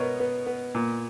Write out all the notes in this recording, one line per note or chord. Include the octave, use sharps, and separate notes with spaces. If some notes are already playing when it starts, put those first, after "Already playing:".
Already playing: B2 B3 A#4 C#5 D#5
B3
B3
A#2